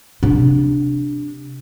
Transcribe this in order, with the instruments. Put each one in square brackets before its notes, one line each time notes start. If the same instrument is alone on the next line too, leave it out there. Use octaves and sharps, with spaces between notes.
[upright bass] C3 D4